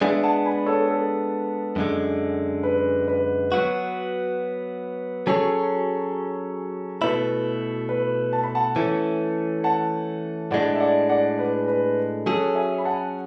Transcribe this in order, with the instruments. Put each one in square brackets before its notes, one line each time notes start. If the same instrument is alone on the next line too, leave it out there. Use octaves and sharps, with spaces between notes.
[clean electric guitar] G#3 B3 D4 [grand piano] E5 G#5
[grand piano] F#5 A5
G#5 B5
A4 C#5
A4
[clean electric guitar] F#2 D3 G#3
[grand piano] B4
B4
[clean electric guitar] F#3 B3 F#4
[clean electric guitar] F#3 C#4 G#4 C#5 [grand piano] A4
[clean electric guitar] B2 A3 E4 [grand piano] B4
[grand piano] B4
A5
B5
F#5 A5
[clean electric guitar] E3 A3 C#4
[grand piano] F#5 A5
[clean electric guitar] A2 G#3 D4 [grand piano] D5 F#5
[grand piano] E5
D5 F#5
D5 F#5
B4
B4
[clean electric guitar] F#3 C#4 G#4 [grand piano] A4
[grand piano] E5 G#5
B5
F#5 A5